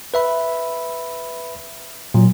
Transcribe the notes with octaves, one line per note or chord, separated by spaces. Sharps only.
B4 E5 B5
A#2 F#3